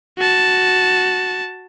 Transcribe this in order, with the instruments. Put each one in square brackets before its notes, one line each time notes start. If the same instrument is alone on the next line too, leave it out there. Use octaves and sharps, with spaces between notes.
[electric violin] F#4 A5